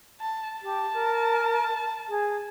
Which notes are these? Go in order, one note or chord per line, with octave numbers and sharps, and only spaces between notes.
A5
G4 A5
A#4
G#4